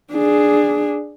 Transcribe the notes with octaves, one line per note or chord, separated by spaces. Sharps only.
D4 G#4